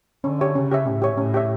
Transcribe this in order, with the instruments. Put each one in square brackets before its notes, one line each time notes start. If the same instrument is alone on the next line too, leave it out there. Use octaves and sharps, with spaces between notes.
[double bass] D3 [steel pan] C#4
[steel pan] G4 C#5 E5
[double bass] C#3 [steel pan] C#4
[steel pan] G4 C#5 E5
[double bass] A2 [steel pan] C#4
[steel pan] G4 C#5 E5
[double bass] A2 [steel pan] C#4
[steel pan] G4 C#5 E5